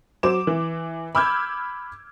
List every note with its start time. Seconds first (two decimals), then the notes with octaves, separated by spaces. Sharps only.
0.23 F#3 C5 D6 E7
0.47 E3
1.15 B5 D6 E6 F6 G6 G#6